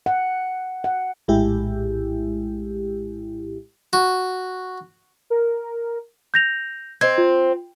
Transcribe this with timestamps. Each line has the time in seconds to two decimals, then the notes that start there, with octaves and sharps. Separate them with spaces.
0.06 F#5
0.84 F#5
1.28 A#1 A2 G#3 E4 G4
3.93 F#4
5.30 A#4
6.34 G6 A#6 F7
7.01 C4 C5 D#5 G#6
7.18 F4